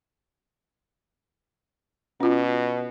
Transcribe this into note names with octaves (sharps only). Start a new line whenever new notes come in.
B2 C#4 F4